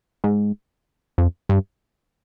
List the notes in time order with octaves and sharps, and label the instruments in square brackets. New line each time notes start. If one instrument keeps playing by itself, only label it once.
[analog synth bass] G#2
F2
G2